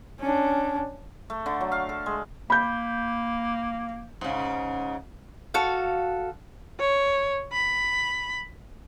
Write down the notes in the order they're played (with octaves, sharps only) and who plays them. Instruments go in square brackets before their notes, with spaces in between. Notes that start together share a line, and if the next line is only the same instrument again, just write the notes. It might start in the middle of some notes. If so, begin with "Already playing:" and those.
[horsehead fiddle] C#4 D4
[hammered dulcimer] A3
D3
F#3
F5
A4
G#3
[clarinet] A#3 [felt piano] B5 G6
[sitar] G#2 C#3
[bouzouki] F#4 A4 F5
[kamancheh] C#5
B5